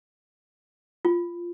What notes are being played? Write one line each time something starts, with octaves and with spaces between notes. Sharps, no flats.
F4